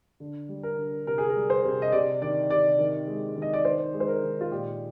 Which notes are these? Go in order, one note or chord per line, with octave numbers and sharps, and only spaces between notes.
D3
G3
A#4
D3
C3 A#4
G#4
A#4
G3
C5
C3
D#5
C3 D5
D#3 D5
C3 D5
D#3
G#3
D#3
D#5
D5
D#3 C5
G#3
C5
A#4
D#3
F4
A#2 G4